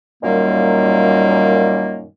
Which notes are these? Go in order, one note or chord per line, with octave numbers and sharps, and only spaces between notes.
F#2 A#2 D#3 G3 A#3